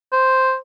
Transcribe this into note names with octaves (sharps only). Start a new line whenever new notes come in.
C5